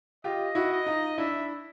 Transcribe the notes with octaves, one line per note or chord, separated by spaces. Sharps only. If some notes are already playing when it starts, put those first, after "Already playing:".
F4 G4 D#5
E4 F#4
D#5
D#4 F4
D4 E4 E5